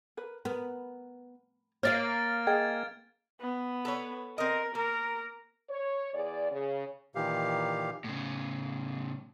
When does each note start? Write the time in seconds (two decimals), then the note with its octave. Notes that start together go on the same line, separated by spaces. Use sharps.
0.17 A#4 B4
0.45 B3 A#4
1.83 A#3 C#5 D5 F5 F6 A6 D7
2.47 G#4 D#5 G5 G#6
3.41 B3
3.85 A4 B4 C#5
4.38 C4 A#4 D#5
4.75 A#3 A#4
5.69 C#5
6.14 E2 G#4 D5
6.51 C#3
7.15 A#2 D#3 E3 G4 F5
8.04 A2 C#3